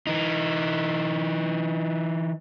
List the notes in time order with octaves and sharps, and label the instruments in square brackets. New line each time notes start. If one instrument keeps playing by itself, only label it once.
[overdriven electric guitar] E3 D#4